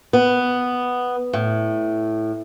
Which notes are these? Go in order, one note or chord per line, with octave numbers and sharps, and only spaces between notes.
B3
A2